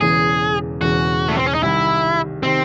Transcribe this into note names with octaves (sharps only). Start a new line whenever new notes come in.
E1 E2 C#3 E3 G#4
E1 E2 C#3 E3 F#4
A3
C4
C#4
D#4
C2 C3 D#3 E4
C3 D#3 C4